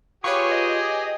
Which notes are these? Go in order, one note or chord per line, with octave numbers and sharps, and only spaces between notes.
F4 G4 G#4 B4 C#5 G#5 C#6
D#5